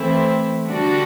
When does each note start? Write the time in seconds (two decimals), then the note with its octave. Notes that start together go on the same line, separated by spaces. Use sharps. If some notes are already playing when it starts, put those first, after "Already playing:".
Already playing: E3 A3 C4 E4
0.67 D3 G3 D4 F#4